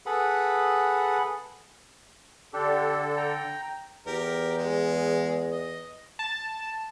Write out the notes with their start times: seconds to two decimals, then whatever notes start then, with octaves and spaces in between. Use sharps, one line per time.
0.06 G#4 A4 B4 F#5 B5
2.53 D3 D4 G4 A4
3.17 G5 A#5
4.06 E2 G4 A#4
4.57 G#3
5.51 D#5
6.19 A5